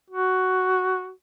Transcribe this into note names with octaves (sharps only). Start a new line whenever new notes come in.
F#4